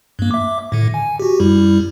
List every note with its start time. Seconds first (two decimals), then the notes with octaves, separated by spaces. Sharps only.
0.19 G2 A#3
0.31 E5 D6
0.72 A2 D3
0.94 G#5
1.20 F#4 G4
1.40 F#2 G3 E4